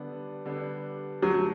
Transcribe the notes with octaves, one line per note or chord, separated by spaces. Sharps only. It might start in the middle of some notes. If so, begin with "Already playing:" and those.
Already playing: D3 G3 B3 D4 G4
D3 G3 B3 D4 G4
F#2 D3 F#3 A3